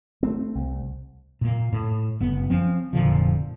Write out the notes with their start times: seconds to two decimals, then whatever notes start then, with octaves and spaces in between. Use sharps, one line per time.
0.23 A3 B3 C4
0.55 C2
1.41 A#2 A#3
1.73 A2
2.20 F#1 B3
2.50 F3 C4 C#4
2.93 F1 A#2 D3 F3